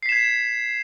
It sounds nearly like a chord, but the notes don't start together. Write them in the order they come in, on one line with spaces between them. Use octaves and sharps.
C7 B6 E7 G#6